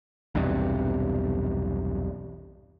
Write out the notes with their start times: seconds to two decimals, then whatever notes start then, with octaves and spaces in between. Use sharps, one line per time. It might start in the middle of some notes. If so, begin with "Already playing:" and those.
0.35 B1 E2 G2 C3